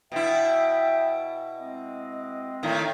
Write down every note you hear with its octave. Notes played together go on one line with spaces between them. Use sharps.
B2 E4 E5 G5
G#3 C4 D#5
A2 D#3